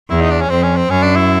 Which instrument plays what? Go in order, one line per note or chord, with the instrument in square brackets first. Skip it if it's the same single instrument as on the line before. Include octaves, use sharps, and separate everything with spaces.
[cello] E2 [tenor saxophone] E4
[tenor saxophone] D#4
D4
C#4
[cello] F2 [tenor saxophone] C4
[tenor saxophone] C#4
C4
[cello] F#2 [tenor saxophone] C#4
[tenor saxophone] D4
E4